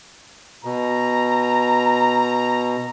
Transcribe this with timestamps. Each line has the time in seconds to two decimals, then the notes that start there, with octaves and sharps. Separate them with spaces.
0.65 B2 A#5